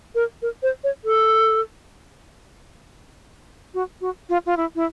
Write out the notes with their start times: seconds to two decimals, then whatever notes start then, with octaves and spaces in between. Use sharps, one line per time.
0.15 A#4
0.42 A#4
0.63 C5
0.84 C#5
1.05 A4
3.74 F#4
4.01 F#4
4.29 F4
4.46 F4
4.57 E4
4.75 E4